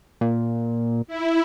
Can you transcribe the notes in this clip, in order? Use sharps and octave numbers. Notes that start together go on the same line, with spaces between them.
A#2
E4